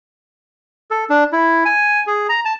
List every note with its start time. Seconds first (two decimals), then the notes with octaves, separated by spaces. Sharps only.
0.91 A4
1.10 D4
1.33 E4
1.65 G#5
2.07 G#4
2.29 A#5
2.45 A5